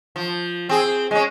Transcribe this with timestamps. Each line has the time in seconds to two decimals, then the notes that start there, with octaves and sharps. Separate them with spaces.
0.16 F3
0.69 C4 G#4
1.11 G#3 C#4